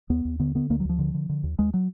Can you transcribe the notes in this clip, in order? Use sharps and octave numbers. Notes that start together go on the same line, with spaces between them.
D#2 B3
D#2
D3 B3
D3 B3
D2 A#3
F#3
D2 F3
D3
D3
D3
D#2
D#2 G#3
F#3